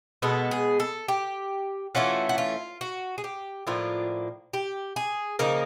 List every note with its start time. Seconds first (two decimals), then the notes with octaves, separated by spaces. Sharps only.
0.22 B2 G#3 B3 A4
0.51 G#4
0.80 A4
1.08 G4
1.95 E3 A3 C#4 F4 F#4
2.29 F#4
2.38 F4
2.81 F#4
3.18 G#4
3.24 G4
3.67 A2 F3 A#3 D4 F4
4.53 G4
4.96 G#4
5.39 C#3 F3 A#3 D#4 A#4